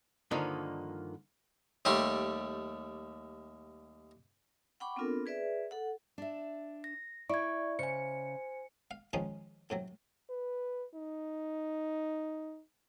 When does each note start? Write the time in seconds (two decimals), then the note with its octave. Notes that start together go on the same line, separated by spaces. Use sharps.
0.31 G2 D3 D#3 F3 A#3 D#4
1.85 D#2 G3 A3 G4 C6
4.80 F#5 G5 B5 C#6 D6
4.96 B3 C4 D4 F4 A4 A#4
5.26 G#4 B4 D5 E5
5.71 A4 F#5
6.18 D4 E5
6.84 A#6
7.29 E4 D5 C#6 G#6
7.79 C#3 C5 G#5 C#7
8.91 F5
9.13 G#2 D#3 F3 G#3 C#4 D#4
9.70 A2 C3 F#3
10.30 B4
10.95 D#4